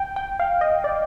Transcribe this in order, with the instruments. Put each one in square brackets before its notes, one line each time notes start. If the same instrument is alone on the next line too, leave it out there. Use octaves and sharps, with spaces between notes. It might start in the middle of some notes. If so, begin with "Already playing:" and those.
Already playing: [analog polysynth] G5
G5
F5
D#5
D5